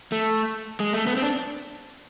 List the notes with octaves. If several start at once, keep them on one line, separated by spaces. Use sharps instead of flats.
A3
G#3
A3
B3
C4
D4